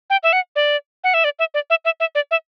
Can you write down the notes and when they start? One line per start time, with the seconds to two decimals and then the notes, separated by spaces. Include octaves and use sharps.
0.10 G5
0.23 E5
0.33 F#5
0.56 D5
1.04 F#5
1.14 E5
1.24 D5
1.39 E5
1.54 D5
1.70 E5
1.85 E5
2.00 E5
2.15 D5
2.31 E5